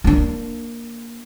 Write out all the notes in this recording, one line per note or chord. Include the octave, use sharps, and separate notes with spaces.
A#3 D4